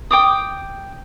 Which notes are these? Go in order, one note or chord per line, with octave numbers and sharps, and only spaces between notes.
G5 D6 D#6